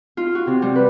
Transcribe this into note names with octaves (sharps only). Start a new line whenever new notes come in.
F4
F#4
C3
G3
B4